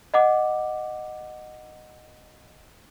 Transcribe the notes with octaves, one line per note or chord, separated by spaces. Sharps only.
D#5 F#5 D6